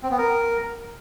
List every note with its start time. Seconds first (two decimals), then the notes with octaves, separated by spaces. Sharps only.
0.03 C4
0.11 B3
0.18 A#4